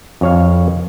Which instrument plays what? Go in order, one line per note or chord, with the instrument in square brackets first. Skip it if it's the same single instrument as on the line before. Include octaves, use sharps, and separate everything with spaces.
[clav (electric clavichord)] F2 C#5 F5